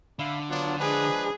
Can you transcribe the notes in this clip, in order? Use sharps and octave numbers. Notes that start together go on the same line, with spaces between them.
D3 E5 F5 B5
F#3 B3 D4 F4
F3 G#3 D4 G#4 B4